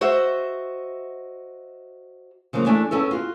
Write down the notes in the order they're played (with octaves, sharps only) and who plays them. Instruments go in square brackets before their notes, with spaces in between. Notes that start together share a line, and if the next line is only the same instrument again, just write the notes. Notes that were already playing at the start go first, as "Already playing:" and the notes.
[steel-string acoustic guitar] F#4 C5 D#5 E5
[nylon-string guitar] C#3 F3 F#3 A#3
E3 A3 D4 G#5
B3 C#4 E4 A4
F4 F#4